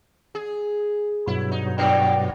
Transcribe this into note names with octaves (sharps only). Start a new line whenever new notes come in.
G#4
G2 B2 F#3 E4
D#4
G#2 B3 D4 G5